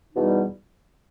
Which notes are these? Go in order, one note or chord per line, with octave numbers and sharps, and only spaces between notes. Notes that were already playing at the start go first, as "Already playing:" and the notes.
E2 B2 G3 D#4